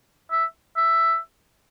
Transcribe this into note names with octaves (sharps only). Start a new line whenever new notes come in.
E5
E5